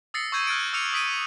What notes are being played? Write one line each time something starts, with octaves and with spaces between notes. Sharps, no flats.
D#6 E6 A6 A#6 C7 C#7
C#6 E6 G6 G#6 D#7
F6 F#6 G#6 A6 C7 D7
D6 E6 F6 C#7 D#7 F7
D#6 B6 D7 D#7